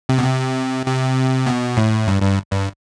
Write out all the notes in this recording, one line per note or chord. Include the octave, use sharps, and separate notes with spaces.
C3
B2
C3
C3
B2
A2
G2
G2
G2